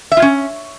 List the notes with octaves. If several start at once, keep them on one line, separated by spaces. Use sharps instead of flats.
E5
F4
C#4